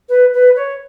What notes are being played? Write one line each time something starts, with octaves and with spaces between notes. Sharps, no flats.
B4
B4
C#5